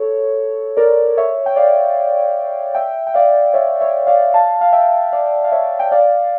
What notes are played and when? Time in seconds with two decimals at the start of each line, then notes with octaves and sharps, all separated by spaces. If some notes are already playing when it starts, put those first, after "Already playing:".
Already playing: A4 C#5
0.77 A#4 D5
1.17 C#5 E5
1.46 G5
1.56 D5 F5
2.75 E5 G5
3.07 G5
3.14 D5 F5
3.54 C#5 E5
3.80 C#5 E5
4.07 D5 F5
4.34 F5 A5
4.61 F5
4.72 E5 G5
5.12 D5 F5
5.44 F5
5.52 C#5 E5
5.79 G5
5.92 D5 F5